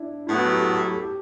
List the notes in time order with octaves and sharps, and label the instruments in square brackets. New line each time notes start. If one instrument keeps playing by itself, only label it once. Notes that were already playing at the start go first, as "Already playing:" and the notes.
Already playing: [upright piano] D4 E4
[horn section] A2 F#3 B3 [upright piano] E4
[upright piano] F#4
G4
A4
G4
A4
G4
A4
G4